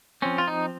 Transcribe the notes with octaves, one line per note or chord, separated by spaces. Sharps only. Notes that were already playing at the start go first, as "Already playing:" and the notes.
F3 C4 C#4
F4
D#4